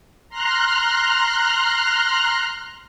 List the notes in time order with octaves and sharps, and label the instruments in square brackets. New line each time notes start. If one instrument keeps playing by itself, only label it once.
[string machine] A#5 C6 F6 F#6